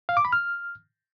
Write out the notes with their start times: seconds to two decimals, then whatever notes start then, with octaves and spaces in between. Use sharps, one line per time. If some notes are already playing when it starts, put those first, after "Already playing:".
0.09 F5
0.17 D6
0.25 B5
0.33 F6